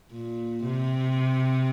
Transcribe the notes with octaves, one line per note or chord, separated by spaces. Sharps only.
A#2
C3